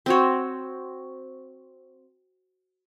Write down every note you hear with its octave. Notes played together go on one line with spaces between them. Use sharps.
C4 F#4 C#5